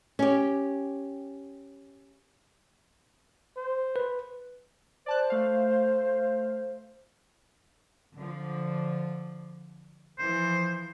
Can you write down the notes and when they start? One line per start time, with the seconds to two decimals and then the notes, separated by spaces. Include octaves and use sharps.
0.19 C#4 G4
3.57 C5
3.96 B4
5.06 C5 D5 A5 F#6
5.30 A3 F5
8.15 D3 F3
10.19 E3 F3 C5